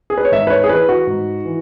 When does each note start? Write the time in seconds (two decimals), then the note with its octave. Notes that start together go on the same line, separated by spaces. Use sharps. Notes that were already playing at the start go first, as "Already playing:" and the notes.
0.10 G#4
0.18 B4
0.25 C#5
0.32 G#2 E5
0.47 B4
0.50 C#5
0.64 G#4
0.69 E3 B4
0.89 F#4
1.07 G#2
1.44 E3